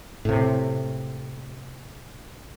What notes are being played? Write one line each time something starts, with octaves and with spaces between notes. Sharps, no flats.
A2 C3